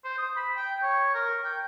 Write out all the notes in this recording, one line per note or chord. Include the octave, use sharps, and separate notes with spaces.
C5
D#6
B5
G5
C#5
A#4
G5